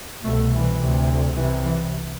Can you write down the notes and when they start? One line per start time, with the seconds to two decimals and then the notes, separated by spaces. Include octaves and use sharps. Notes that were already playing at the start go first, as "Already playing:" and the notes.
0.22 C2 B2 A3
0.51 E3
0.79 D2 C3
1.35 C2 C3 E3
1.64 E3